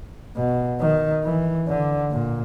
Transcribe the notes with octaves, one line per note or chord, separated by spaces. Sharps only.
B2
D#3
E3
D3
A#2